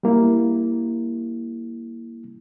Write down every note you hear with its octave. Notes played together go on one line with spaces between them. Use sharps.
G3 A#3 E4